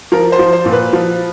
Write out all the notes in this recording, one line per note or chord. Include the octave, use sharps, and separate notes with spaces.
F3 A#4
C5
F3
C5
A#2
B4
F3